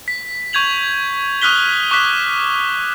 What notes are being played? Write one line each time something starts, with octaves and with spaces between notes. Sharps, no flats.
B6
C#6 G6 G#6 F7 F#7
C#6 D#6 F6 F#6 B6 G7
C#6 D6 F#6 B6